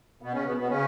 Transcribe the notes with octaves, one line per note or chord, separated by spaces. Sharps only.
B2 B3
C#3 C#4
B2 B3
B2 B3
C#3 C#4